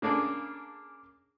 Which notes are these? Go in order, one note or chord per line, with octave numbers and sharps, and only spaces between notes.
C#3 A#3 D4 G#4 A4